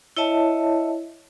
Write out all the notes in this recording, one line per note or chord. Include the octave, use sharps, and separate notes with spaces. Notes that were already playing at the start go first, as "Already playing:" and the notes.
E4 C#5 D#5 E5 A5